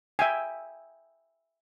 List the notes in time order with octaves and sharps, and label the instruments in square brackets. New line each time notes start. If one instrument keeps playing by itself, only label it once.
[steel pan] E5 G5 G#5